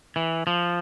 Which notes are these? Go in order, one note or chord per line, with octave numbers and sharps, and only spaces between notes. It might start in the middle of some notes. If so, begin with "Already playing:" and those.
E3
F3